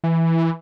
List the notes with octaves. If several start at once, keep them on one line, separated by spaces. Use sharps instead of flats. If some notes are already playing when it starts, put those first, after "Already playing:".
E3